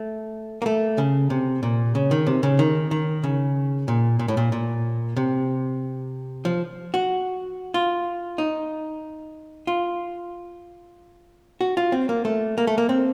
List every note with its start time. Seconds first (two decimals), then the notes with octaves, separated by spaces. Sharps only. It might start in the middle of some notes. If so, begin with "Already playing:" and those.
Already playing: A3
0.62 A#3
0.66 A3
0.98 C#3
1.30 C3
1.63 A#2
1.95 C#3
2.11 D#3
2.27 C3
2.43 C#3
2.59 D#3
2.91 D#3
3.23 C#3
3.88 A#2
4.19 A#2
4.28 A2
4.37 A#2
4.52 A#2
5.16 C3
6.45 F3
6.94 F#4
7.74 F4
8.38 D#4
9.67 F4
11.61 F#4
11.77 F4
11.92 C4
12.09 A#3
12.25 A3
12.58 A#3
12.67 A3
12.78 A#3
12.89 C4